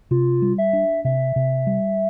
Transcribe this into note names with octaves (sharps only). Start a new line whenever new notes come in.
C3 F4
G3
E5
D4
C3 E5
C3
G3